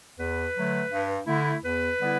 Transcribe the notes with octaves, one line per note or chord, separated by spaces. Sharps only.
E2 B4
D3 F#3 A3
G2
D3 A3 E4
E2 B4
D3 G3 B3 E4